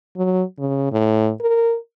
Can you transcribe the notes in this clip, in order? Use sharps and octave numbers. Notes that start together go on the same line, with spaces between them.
F#3
C#3
A2
A#4